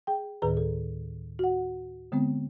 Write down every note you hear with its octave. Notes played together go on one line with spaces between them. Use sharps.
G#4 G5
D2 A2 D#3 G#4 B4 A#5
A4
F#4 F#5
D3 G#3 B3 C4